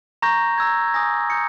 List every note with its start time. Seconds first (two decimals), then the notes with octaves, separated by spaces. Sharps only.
0.22 A#5 C#6 G6 A#6
0.58 A#5 E6 G6 G#6
0.88 G#6
0.94 G#5 D#6 G6 A#6
1.30 A#5 D#6 G6 C#7